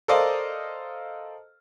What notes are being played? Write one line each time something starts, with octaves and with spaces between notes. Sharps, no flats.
A4 A#4 C5 D5 D#5 F5